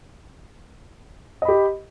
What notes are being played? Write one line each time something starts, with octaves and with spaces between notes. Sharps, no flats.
G4 D#5 B5